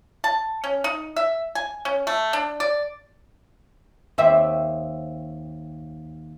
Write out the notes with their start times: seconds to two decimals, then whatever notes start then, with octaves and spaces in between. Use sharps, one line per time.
0.24 A5
0.64 C#4
0.84 D#4
1.16 E5
1.55 G#5
1.85 C#4
2.07 A3
2.33 D4
2.60 D5
4.18 D#2 C4 E5